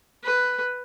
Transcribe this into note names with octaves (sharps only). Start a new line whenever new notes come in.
B4